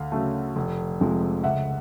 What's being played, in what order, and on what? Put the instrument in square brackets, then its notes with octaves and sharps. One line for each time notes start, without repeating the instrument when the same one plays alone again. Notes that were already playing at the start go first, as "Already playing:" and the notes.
Already playing: [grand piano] D2 F5
C#3 F#3 A3
F1
F2 C3 F3 G#3
C#2 E5 F#5